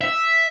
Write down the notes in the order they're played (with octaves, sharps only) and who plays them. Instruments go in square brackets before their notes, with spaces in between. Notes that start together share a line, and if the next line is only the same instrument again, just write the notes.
[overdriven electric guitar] E5